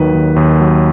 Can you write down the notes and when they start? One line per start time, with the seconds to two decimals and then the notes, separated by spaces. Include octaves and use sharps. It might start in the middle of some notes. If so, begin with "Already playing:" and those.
Already playing: D#2 D#3 F#3 B4
0.14 D#2
0.36 D#2
0.60 F#3